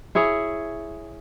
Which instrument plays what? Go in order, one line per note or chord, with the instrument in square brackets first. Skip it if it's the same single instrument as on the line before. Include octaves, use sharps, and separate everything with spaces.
[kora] E4 G#4 C#5